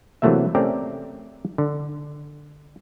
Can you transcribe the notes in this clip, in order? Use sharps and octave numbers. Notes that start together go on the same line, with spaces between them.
C3 E3 F#3 A3 A#3 E5
A3 C4 C#4 G4 A#4 D5
D3